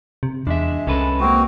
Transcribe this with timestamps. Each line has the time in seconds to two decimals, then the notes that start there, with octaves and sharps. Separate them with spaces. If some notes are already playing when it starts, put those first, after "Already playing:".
0.23 C3
0.47 E2 G#3 D4 E5
0.87 C2 C#4 A4 B4
1.20 G#3 A#3 C4 F#4